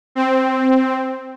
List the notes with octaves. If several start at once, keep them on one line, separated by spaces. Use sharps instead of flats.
C4